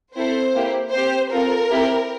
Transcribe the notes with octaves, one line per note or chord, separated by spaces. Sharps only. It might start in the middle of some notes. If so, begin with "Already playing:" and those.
C4 E4 A4 C5
A#3 E4 G4
C4 G4 C5
C4 F4 A4 A#4
C4 E4 G4